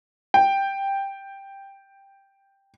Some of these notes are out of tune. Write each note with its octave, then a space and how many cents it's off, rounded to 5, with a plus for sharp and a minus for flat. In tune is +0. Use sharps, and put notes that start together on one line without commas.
G5 +5